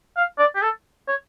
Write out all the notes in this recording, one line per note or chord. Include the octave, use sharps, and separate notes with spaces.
F5
D5
G4
A4
C#5